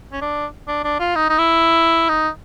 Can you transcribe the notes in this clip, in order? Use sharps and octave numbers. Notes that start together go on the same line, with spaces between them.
C#4
D4
D4
D4
F4
D#4
D#4
E4
D#4